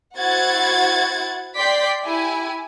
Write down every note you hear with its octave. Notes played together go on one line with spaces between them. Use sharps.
E4 F#4 C5 F#5 G#6 A6
D5 G5 C6 D6 G6 B6
E4 G4 G#5